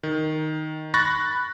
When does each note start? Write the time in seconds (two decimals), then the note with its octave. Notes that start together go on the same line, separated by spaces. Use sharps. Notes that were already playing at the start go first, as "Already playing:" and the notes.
0.03 D#3
0.94 B5 C#6 F#6 A6 A#6